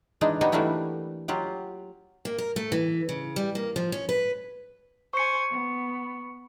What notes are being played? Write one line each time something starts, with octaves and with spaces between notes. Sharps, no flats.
E3 G#3 D4 D#4
G3 B3 D#4 F#4 C#5 D#5
E3 G3 A3 A#3 D4 E4
F#3 F4 G4 F#5
A#3
A#4
A3
E3
C#3
G3
A#3
F3
C#4
B4
C5 G#5 C#6 C#7
B3